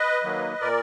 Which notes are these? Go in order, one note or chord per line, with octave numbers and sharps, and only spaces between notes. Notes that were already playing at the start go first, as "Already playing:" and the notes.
Already playing: B4 D#5
D#3 F#3 A#3
A#2 A#4 D5